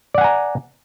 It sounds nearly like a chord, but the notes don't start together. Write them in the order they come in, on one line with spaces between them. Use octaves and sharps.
D5 F#5 G#5 A#5